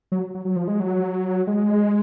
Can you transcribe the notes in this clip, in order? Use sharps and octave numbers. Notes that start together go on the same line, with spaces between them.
F#3
F#3
F#3
F3
G#3
F#3
G#3